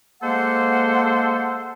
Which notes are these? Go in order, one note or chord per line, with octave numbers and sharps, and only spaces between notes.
G#3 A#3 A4 C5 F#5